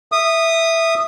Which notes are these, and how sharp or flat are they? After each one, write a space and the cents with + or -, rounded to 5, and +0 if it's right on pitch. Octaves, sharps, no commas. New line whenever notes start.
E5 +0 D#6 -15